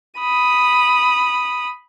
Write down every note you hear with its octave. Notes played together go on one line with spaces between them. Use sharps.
B5 D#6